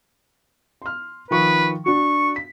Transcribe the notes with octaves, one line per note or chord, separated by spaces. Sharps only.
C6 F6
D#3 F3 B4 C#6
D4 F#4 C#6
B6